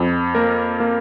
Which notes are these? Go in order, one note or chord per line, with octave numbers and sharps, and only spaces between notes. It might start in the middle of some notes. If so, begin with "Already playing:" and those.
Already playing: F2
A#3 A#4
A#3